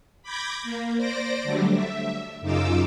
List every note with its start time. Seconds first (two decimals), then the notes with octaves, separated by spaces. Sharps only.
0.23 B5 D6 G6 G#6 A#6
0.63 A#3
0.97 C5 D5 D6 A#6
1.43 D3 F#3 G3 A3 D4
1.72 E5
2.41 F#2 C#3 D#4 F4 D6 E6